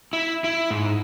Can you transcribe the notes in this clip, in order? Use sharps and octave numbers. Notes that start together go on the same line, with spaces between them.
E4
E4
G#2